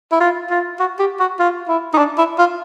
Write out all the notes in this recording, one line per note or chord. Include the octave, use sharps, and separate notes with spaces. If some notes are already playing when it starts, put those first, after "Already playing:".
E4
F4
F4
F#4
G4
F#4
F4
E4
D#4
D4
E4
F4